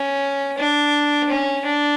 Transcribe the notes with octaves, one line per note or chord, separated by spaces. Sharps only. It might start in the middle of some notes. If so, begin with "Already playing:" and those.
Already playing: C#4
D4
C#4
D4